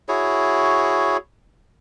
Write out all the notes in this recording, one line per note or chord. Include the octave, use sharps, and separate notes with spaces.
E4 F#4 G#4 C#5